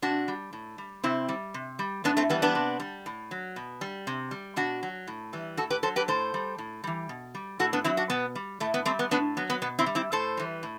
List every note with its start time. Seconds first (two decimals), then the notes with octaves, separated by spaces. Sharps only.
0.02 C3 D4 F#4
0.28 G3
0.53 A2
0.78 G3
1.04 C3 C4 E4
1.29 G3
1.54 C3
1.79 G3
2.04 A2 B3 D4
2.17 A3 C4
2.30 E3 G3 B3
2.42 B3 D4
2.55 C3
2.80 G3
3.06 A2
3.31 F#3
3.56 B2
3.81 G3
4.07 C3
4.31 G3
4.56 B2 D4 F#4
4.83 F#3
5.07 A2
5.33 E3 G3
5.57 A2 F#4 A4
5.70 G4 B4
5.83 F#3 A4 C5
5.96 G4 B4
6.08 A2 A4 C5
6.34 G3
6.58 A2
6.84 E3 G3
7.09 B2
7.35 G3
7.59 A2 F#4 A4
7.73 B3 D4
7.84 F#3 C4 E4
7.97 D4 F#4
8.10 B2 B3
8.35 G3
8.60 A2 A3
8.74 B3
8.85 G3 A3 C4
8.99 B3
9.11 A2 B3 D4
9.37 F#3 B3
9.50 B3
9.62 B2 B3
9.79 C4 E4
9.86 G3
9.95 C4 E4
10.12 A2 A4 C5
10.37 E3 G3
10.63 A2